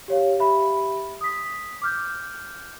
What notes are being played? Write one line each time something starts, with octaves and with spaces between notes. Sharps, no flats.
G4 C#5 F5
G4 E5 B5
D#6 B6
D6 F6 G6